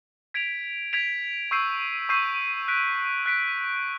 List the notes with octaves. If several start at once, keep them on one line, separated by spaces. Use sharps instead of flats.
G#6 B6 D7 F7
G#6 B6 D7 F7
C#6 E6 G6 C7 D#7
C#6 E6 G6 C7 D#7
F#6 B6 D7
F#6 B6 D7